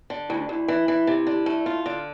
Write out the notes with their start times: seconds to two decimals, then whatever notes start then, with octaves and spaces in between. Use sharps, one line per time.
0.10 D3
0.29 D2 E4
0.40 D4
0.49 D2 E4
0.68 E3
0.88 E3
1.07 C3
1.27 D3
1.46 A3
1.66 F4
1.86 D3